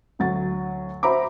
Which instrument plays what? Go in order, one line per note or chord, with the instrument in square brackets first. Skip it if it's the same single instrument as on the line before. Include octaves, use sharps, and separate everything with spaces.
[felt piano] D2 F#3 A6
F#4 C5 E5 A#5 B5 D6